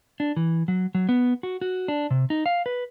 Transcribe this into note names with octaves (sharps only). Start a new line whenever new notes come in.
D4
E3
F#3
F#3
B3
F#4
F#4
D4
C3
D#4
F5
B4